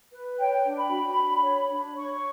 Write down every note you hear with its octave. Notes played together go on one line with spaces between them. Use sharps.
B4
C#5 G5
D4
B5
F#4
D4
C#5
D4
C#5 C#6